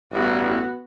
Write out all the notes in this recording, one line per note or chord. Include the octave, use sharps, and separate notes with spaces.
A1 G2 B3 F#4